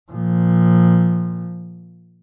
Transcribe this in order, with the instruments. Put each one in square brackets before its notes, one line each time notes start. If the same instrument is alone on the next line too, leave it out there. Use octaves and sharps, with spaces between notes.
[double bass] A#2 F3